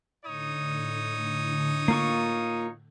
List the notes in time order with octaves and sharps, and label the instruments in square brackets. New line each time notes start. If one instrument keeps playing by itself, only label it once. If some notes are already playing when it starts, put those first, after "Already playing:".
[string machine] A2 D3 [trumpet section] D#4 C#5 D#6
[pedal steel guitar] A#3 F4 C#6